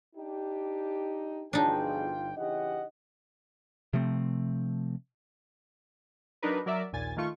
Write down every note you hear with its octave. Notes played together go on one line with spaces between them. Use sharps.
D4 D#4 G4
G1 B2 F3 D4 D#4 F4 G#4 G5
C#3 E3 G4 D#5 F#5
C3 F3 A3 C4
F#3 D4 D#4 A#4 B4
F#3 A#4 D5 E5
A#1 D#2 A#2 G#5 A6
D#3 A3 F4 C#6